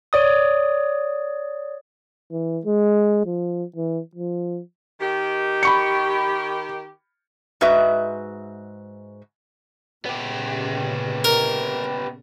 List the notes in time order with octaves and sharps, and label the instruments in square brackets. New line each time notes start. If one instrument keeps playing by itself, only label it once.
[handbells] C#5 D5 D#6
[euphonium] E3
G#3
F3
E3
F3
[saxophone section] D#3 G4
[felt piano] B5 C#6 C#7
[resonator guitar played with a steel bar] G#2 G#3 F#4 B4 E5
[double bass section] A#2 C#3 [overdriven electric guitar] B3 G4
[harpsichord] A#4